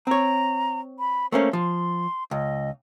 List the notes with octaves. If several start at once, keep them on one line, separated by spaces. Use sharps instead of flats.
C4 C#5 A#5
B5
A3 A#3 C#4 C5
F3 C6
C#2 D#5